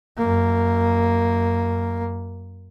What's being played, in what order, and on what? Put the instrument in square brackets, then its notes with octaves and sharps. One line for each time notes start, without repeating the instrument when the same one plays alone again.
[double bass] F#2 A#3